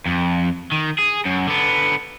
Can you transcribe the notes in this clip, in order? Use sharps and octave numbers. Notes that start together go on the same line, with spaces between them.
F2
D#3
G#4
F#2
D3 B3